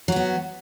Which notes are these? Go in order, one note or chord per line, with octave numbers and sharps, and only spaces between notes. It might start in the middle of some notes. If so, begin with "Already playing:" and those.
F#3 B3 F#4